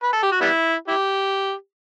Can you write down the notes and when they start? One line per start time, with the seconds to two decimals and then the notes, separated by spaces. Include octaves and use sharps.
0.03 B4
0.13 A4
0.23 G4
0.32 F#4
0.41 G3 B3 E4
0.88 E4 G4